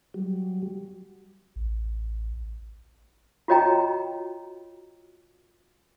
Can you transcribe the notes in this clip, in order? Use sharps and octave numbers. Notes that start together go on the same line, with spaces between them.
F#3 G3
A1
F4 F#4 C#5 D#5 G5 A#5